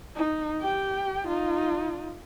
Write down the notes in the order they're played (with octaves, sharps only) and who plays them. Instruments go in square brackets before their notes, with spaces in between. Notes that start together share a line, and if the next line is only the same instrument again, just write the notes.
[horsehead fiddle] D#4
G4 G5
D#4 F4